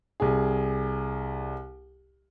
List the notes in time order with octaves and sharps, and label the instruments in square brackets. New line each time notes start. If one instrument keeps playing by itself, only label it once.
[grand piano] C2 G#4